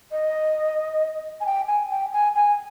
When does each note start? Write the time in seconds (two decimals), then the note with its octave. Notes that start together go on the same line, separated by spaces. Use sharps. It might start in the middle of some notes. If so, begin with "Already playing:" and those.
0.12 D#5
1.40 G#5
1.46 G5
1.67 G#5
1.90 G5
2.13 G#5
2.35 G#5